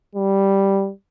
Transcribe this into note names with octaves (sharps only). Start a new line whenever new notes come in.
G3